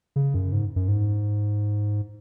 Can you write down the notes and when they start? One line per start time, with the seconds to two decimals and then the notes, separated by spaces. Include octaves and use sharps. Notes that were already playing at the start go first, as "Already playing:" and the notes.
0.16 C#3
0.34 F#2
0.52 G#2
0.76 F#2
0.88 G#2